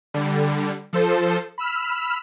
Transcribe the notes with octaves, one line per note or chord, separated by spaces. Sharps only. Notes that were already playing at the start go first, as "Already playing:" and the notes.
D3 G3
F3 A4 C5
B5 E6 F6